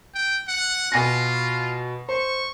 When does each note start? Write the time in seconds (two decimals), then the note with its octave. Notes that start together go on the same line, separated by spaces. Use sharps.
0.15 G5
0.48 F#5
0.92 B2 F4 G#5 A#6
2.09 C5 C#6